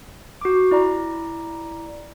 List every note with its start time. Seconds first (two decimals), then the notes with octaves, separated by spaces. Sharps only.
0.41 F#4 D6
0.71 E4 D5 A#5